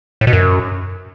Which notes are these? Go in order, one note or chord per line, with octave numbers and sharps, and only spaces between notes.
A2
B2
F#2